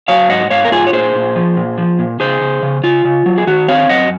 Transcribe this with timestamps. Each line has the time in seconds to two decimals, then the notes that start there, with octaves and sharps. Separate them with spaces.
0.08 F#3 C#5 F5
0.29 G#2 D#5 F#5
0.50 G#2 C#5 F5
0.65 A#4
0.72 G#2 F4 G#4
0.87 C#5
0.93 A#2 G#4 C5
1.15 A#2
1.36 F3
1.57 A#2
1.78 F3
1.99 A#2
2.20 C#3 G#4 C5
2.41 C#3
2.63 C#3
2.83 C#3 F4
3.05 C#3
3.26 F#3
3.38 G#4
3.47 D#3 F#4
3.68 C4 C#5 F5
3.89 F#2 D#5 F#5